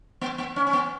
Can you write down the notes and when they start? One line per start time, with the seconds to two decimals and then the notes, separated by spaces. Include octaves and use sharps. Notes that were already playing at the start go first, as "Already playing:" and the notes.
0.21 B3
0.38 B3
0.56 C#4
0.67 C#4
0.73 B3